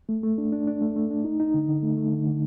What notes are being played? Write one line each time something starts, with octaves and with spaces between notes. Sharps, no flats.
A3
A3
D4
D4
D4
A3
A3
D4
D#4
D#4
D3
D3
A3
A3
D3
D3